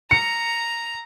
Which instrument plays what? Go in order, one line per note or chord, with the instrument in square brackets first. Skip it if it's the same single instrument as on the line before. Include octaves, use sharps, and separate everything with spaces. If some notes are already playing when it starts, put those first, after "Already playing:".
[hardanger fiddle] A#5 [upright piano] C#7